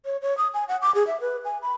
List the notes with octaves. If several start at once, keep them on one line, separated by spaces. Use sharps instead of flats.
C#5
C#5
D#6
G#5
F#5
D6
G#4
E5
B4
G#5
B5